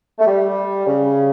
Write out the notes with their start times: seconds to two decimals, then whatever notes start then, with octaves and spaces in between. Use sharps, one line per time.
0.19 A3
0.26 G3
0.86 C#3